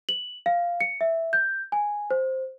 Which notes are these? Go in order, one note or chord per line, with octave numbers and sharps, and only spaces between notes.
F#7
F5
C#7
E5
G6
G#5
C5